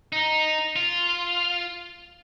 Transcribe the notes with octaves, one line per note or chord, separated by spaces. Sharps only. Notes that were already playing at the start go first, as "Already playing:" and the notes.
D#4
F4